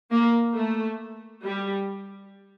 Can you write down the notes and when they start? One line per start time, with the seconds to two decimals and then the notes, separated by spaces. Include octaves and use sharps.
0.11 A#3
0.56 A3
1.44 G3